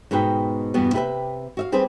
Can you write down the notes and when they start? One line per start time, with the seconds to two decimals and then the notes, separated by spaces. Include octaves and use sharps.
0.11 G#2 B2 G#4 B4 G5
0.74 E2 G2 B2 G3 B3
0.93 C3 E4 G4 A#4 B4 E5
1.57 F#4 E5 F5
1.72 G3 C4 G4 G#4 B4 C5